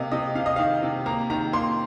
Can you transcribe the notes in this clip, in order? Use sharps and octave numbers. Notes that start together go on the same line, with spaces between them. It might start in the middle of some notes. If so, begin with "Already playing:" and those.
Already playing: C3 A#3 D#5 F5
C3 D#5
C3 F5
D#5
D#3 F5
C3
A#3 A#5
D#3 A#5
A#3 C6